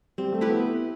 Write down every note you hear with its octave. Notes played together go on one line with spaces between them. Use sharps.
G3 C4
A3
E4 G4 B4
B3